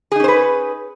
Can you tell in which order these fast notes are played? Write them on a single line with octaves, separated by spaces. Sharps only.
G#4 D#4 C#4 C5 B4